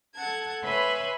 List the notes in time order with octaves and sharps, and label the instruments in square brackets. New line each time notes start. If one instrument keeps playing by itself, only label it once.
[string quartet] A4 F#5 A5 G#6
B4 C#5 E5 G#5 B5 C6